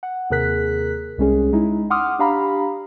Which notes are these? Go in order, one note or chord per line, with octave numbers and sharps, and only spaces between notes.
F#5
D#2 C3 G#4 A#4 F#6 B6
C2 G#3 C#4 G#4
G#3 D#4 E4
F#5 C6 D6 D#6 F6
D4 G4 F5 A#5 B5